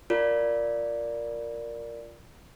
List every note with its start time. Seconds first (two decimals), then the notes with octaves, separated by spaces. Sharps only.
0.10 F4 A#4 D5